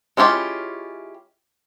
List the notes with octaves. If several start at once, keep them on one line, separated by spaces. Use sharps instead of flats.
G#3 C#4 E4 F4 G4